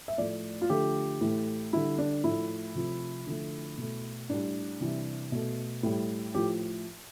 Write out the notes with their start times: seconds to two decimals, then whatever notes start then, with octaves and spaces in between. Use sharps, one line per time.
0.08 E5
0.18 A2 F3 A3 D5
0.62 F4
0.69 D3 F3 A3 G4
1.21 A2 E3 A3
1.73 D3 G3 E4
1.98 D4
2.24 A2 F3 A3 E4
2.75 C3 F3 A3
3.26 D3 F3 A3
3.78 B2 A3
4.30 A2 G3 D4
4.81 C3 E3 G3
5.32 B2 A3
5.83 A2 G3
6.34 A2 F3 G4